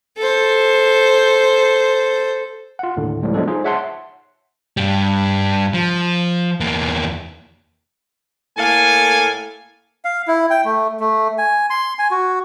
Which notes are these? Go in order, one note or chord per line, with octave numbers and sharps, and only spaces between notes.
A4 C5
F4 F#5
D#2 A2 D3
C#2 A2 F3 G3
F3 F#3 G#3 B3 D4 A4
D#4 F4 G#4 C5
C#5 E5 F#5 A5 C6
G2 G3
F3
E2 A#3
A2 A#3 A4 F5 G#5
F5
E4
G5
A3
A3
G#5
C6
G#5
F#4